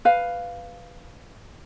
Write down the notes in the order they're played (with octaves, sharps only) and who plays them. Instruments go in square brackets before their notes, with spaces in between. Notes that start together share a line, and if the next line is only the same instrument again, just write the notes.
[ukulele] B4 F5